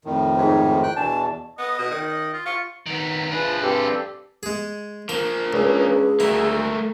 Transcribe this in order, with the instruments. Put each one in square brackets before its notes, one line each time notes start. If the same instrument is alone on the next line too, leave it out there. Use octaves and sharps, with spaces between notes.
[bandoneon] F2 A2 D#3
[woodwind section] G#2
[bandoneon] G5 F#6
[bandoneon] E2 B2 [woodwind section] D4 G#5 A5
[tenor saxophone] B3 [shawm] D#5
[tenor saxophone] B2
D#3
[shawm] D#5
F4
[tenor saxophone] F4 [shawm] C#6
[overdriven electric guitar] D#3 B3
[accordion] F3 B4 [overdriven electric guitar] D4 G#4
[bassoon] G2 [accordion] C4 G4 A4
[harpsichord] G#3 G#4
[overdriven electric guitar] F3 A#3 [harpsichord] A#4
[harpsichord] C#2 [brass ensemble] C#4 D4 B4 [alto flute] G#4
[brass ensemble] D2 [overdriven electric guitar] A3 A#3 [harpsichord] E4
[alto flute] A4